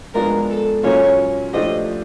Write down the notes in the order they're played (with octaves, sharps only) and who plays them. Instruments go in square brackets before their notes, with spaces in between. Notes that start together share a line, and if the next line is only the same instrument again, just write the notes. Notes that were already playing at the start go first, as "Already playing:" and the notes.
[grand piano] F3 G#3 B3 D4 F4 [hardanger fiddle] A#4
[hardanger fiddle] A4
[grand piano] A#2 F#3 A#3 C#4 F4 [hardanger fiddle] C#5
[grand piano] F3 A3 D4 G4 C5 [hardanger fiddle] D#5